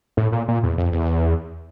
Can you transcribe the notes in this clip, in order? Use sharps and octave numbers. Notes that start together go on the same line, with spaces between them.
A2
A#2
A#2
E2
F2
E2